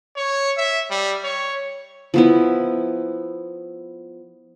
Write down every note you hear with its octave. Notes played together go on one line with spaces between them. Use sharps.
C#5
E5
G3
C#5
F3 B3 E4